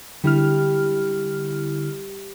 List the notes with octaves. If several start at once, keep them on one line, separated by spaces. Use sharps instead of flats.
D3 G3 E4 F6